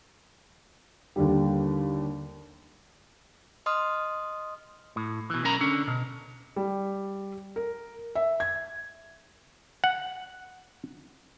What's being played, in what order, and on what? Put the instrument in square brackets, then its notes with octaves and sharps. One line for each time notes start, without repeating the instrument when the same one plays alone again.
[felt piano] D#2 D3 G3
[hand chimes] D#5 C6 D#6 F6
[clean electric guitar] A2
B2 E3
B1 C#4 A#4 A#5 B5
D3 C#4
B2
[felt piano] G3
A#4
E5
G#6
[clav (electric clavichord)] F#5